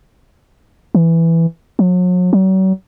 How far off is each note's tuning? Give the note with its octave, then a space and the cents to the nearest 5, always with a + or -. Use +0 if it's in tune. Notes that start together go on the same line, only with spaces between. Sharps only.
E3 +5
F#3 -40
F#3 +40